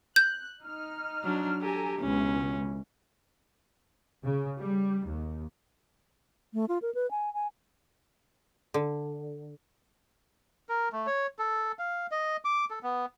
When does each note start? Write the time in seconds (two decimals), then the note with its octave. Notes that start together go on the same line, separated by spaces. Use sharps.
0.16 F#6 G6
0.62 D#4 F6
1.23 F#3 D4
1.61 G4 A4 G#5 A#5
2.01 C#2 B2 E3 C#4
4.25 C#3
4.60 G3
5.06 D#2
6.54 A3
6.69 F4
6.82 A#4
6.95 B4
7.11 G#5
7.34 G#5
8.74 D3
10.69 A#4
10.92 A3
11.07 C#5
11.39 A4
11.79 F5
12.11 D#5
12.45 D6
12.70 A4
12.83 B3